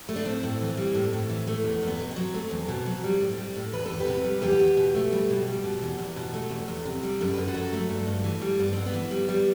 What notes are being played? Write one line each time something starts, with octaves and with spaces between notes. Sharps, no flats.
A3
D4
A2 C4
A2
E3
G3
A2
A2
E3
A3
E2
E2 B3
B2
C4
F#3
A3
E2
B2
F#3
G3
A2
G3
A2
E2 B4
E2 A4
G4 B4
C3
G3
E2 G4 B4
E2
B2
A3
G3
B2
G3
B2
E2
E2
B2
A3
E2
E2
C3
G3
F#2 A4
F#2 B4
F#4 A4
F#3
A3
G2
G2
E3
G3
G2 B3
G2 C4
B3
E3
G3
G3